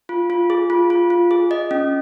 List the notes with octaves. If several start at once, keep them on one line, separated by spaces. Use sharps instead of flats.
F4
F4
G#4
F4
F4
F4
G#4
D#5
C#4